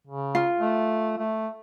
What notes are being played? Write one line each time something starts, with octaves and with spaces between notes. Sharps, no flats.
C#3
F4
A3
A3